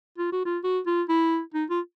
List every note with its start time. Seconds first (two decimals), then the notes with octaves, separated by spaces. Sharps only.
0.18 F4
0.32 F#4
0.45 F4
0.64 F#4
0.86 F4
1.09 E4
1.54 D#4
1.70 F4